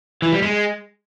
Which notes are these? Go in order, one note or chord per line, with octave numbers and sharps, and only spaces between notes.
E3
G3
G#3